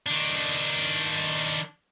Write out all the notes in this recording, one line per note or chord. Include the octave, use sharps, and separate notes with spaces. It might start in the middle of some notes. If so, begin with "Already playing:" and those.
D#3 D4